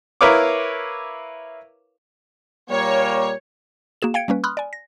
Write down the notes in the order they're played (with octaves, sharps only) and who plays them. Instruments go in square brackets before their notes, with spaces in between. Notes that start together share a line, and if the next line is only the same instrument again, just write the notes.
[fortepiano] E4 A#4 B4 C#5 F5 D6
[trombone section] A#2 G3 A#3 [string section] C#5
[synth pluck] A#3 F#4 G#4 E7
F5 G5 G#6 C#7 D7
G3 A#3 C#4 B4
B5 C6 D#6 F6 F#6
D5 G#5
A#6